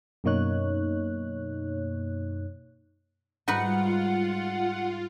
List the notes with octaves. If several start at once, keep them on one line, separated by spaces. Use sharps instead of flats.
F#2 B2 A#3 D#4 C#5 F#6
G#2 G3 D#4 F4 F#4 B4 F#5